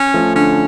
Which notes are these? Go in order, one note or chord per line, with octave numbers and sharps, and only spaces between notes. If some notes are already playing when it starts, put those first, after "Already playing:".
Already playing: C#4
F3 A3
D3 C#4